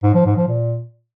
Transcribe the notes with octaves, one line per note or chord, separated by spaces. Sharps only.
G#2
F3
G#2
F3
A#2